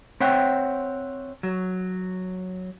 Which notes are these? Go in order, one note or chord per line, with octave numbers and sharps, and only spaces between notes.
C4 C#5 E5 F#5 G5
F#3